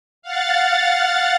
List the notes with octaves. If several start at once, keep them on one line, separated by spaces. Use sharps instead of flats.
F5 F#5 A6